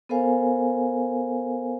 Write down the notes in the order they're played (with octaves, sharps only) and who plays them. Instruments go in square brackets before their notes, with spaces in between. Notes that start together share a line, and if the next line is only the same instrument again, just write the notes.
[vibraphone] B3 A4 A#4 C5 F5 G#5